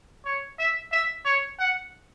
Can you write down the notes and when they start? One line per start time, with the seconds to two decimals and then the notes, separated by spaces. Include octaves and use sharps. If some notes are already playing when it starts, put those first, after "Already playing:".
0.26 C#5
0.59 E5
0.93 E5
1.25 C#5
1.59 F#5